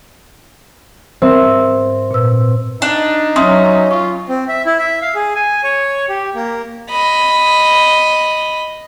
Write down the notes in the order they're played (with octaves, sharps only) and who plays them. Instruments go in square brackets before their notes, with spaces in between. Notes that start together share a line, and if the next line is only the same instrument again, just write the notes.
[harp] C4 [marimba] A#4 E5
[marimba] G#2
A#2 B4 E6
[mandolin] D4 [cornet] D#4
[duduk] F#3 [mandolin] C#4 [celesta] E5 C6 D#6
[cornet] F4 [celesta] C#6
[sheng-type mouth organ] C4
E5
E4
E5
F5
G#4
G#5
C#5
G4
A#3
[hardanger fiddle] D#5 B5